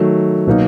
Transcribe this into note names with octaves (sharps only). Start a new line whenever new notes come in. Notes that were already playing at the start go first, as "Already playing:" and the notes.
Already playing: D#3 F#3 A3
B2 F#3 A#3 D#4